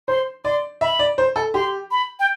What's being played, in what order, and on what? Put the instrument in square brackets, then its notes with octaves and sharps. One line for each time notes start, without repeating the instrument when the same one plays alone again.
[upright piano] C5 [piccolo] C6
[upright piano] D5 [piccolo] C6
[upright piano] E5 [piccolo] B5
[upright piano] D5
C5
A4
[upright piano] G4 [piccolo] C6
[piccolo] B5
G5